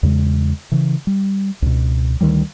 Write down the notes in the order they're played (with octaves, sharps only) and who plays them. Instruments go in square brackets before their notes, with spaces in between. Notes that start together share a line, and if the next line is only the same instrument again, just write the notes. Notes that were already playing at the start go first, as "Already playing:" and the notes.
[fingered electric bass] E2 C#3 G#3
C#3 E3
G3
C#2 B2
D2 D#3 F#3 G3